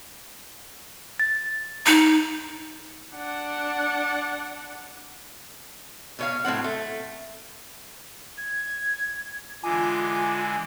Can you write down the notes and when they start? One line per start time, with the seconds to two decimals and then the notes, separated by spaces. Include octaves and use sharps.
1.20 A6
1.86 D#4
3.14 D4 F#5
6.19 B2 C#5 F5
6.44 A2 F#3 C4 F#5
6.64 A3
8.38 G#6
9.63 D3 E3 G#3 F4 G#5 D6